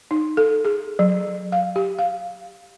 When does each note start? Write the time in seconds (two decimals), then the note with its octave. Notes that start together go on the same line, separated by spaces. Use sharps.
0.11 D#4
0.37 A4
0.65 G#4
0.99 F#3
1.52 F5
1.76 G4
1.99 F5